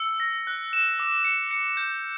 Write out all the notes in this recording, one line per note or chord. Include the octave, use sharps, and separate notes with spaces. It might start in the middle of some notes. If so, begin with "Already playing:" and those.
Already playing: E6 C#7
A#6
F#6
E7
D6
C#7
C#7
G6